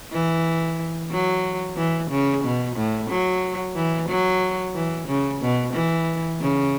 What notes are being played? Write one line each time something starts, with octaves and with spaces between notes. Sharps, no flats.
E3
F#3
E3
C#3
B2
A2
F#3
E3
F#3
E3
C#3
B2
E3
C#3